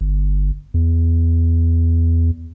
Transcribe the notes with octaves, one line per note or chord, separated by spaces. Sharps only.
G1
E2